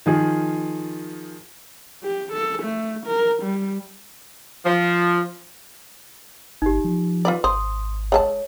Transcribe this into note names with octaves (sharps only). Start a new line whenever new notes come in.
D#3 F3 G#4
G4
A4
A3
A#4
G3
F3
G1 D#4 G4
F3
F4 B4 D5
G#1 C5 C6 D#6
G#3 A4 C#5 A5